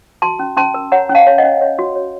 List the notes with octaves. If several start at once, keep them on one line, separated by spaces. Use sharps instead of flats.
F#4 A5 C6
C#4
C#4 A5 C6
A#4
C#5 F#5 A#5
C#4
F5 A5
C#5
D#5 F#5
C#4
C#5
F#4
C#5